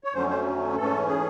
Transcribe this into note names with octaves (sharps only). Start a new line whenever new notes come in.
C#5
F2 D3 F#3 A3 C#4 C5
C5
G#2 E3 A3 C#4 A4
G#4